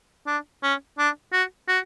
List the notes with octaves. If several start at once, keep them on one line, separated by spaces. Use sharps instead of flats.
D4
C#4
D4
F#4
F#4